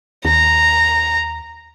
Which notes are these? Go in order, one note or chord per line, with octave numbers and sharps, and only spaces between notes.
D#2 A#5